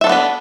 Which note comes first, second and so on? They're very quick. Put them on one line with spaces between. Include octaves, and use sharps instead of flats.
E5 A4 D4 B3 B4